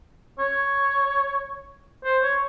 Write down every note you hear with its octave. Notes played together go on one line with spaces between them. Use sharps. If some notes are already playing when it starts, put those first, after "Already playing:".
C#5
C5
C#5